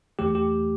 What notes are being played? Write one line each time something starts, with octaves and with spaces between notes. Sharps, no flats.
E2 E3 A3 G4
G4